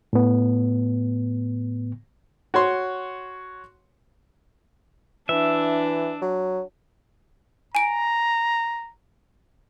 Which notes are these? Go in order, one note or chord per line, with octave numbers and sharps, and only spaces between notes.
A2 B3
F#4 C#5 C6
E3 D4 E5
F#3
G#5 A#5 D7